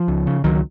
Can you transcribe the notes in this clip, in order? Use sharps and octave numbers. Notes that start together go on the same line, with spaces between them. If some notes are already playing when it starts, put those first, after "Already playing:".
Already playing: F3
C#2
C#3
C#2 D#3 F#3